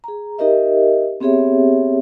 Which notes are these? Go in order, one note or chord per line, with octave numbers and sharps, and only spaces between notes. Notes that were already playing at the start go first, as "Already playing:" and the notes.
G#4 A#5
D#4 G4 A#4 D#5 E5
B3 C4 G4 G#4 C#5 E5